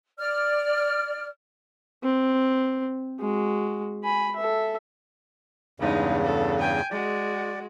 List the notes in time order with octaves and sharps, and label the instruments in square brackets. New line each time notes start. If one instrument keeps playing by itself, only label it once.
[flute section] D5 F6
[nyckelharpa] C4
G#3 F#4
G#5 B5
A4 E5
[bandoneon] E2 G2 C#3 [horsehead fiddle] G#3 D#4
[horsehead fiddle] A4
G5 G#5
[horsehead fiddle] G#3 F#4 [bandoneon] D5